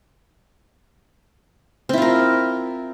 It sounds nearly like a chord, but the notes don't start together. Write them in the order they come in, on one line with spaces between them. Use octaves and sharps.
C4 E4 F4 A#4